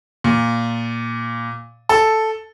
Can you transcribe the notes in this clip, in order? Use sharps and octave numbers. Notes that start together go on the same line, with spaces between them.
A#2
A4